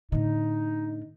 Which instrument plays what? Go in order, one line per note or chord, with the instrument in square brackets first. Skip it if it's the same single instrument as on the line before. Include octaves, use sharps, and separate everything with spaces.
[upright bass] A2 D3 [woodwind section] D#4